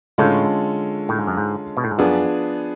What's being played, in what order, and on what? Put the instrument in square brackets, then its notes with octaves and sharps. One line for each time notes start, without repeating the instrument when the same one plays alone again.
[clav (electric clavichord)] A2 [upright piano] D3 G#3 C#4 F4 A4
[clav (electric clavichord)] A2
G#2
F#2
G#2
B2
A2
G#2
[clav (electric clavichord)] F#2 [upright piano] F3 B3 D4 G#4